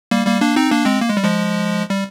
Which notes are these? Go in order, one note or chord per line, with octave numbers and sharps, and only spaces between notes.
G3 A#3
G3 A#3
A#3 D4
C4 D#4
A#3 D4
G#3 C4
A#3
G#3
G3
F3 G#3
G3